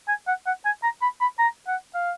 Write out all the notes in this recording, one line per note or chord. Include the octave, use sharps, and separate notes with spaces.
G#5
F#5
F#5
G#5
A#5
B5
B5
A#5
F#5
F5